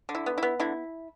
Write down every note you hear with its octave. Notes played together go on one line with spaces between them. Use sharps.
D3
E4
B3
E4
B3
D3 E4